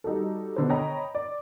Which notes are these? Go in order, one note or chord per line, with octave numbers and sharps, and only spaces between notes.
G3 D#4 F#4 A4
B2 D3 C5
C#5 D#5 G5 A#5 B5
D5